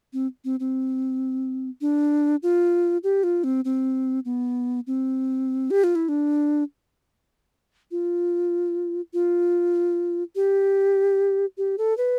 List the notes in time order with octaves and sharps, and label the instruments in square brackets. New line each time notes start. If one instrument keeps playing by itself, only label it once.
[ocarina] C4
C4
C4
D4
F4
G4
F4
C4
C4
B3
C4
G4
F4
E4
D4
F4
F4
G4
G4
A4
B4